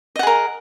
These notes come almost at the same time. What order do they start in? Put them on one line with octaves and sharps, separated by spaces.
D#5 F#5 G#4 A#4